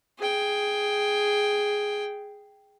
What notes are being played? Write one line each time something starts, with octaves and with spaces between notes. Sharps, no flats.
G#4 G5